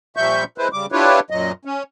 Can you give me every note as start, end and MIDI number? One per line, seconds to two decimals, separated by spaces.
0.17 0.44 46
0.17 0.44 53
0.17 0.44 55
0.17 0.44 76
0.17 0.44 85
0.17 0.44 91
0.58 0.68 56
0.58 0.68 64
0.58 0.68 71
0.58 0.68 72
0.73 0.86 49
0.73 0.86 55
0.73 0.86 86
0.92 1.20 62
0.92 1.20 64
0.92 1.20 65
0.92 1.20 67
0.92 1.20 71
0.92 1.20 73
1.30 1.52 42
1.30 1.52 46
1.30 1.52 54
1.30 1.52 75
1.65 1.83 61